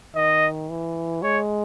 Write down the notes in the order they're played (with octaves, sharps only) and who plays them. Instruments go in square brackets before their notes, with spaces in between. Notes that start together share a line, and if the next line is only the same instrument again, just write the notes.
[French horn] D#3 [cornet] D#5
[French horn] E3
[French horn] G#3 [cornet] C#5